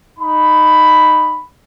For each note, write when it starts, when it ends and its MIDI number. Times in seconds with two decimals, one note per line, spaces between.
0.19 1.41 63
0.19 1.41 83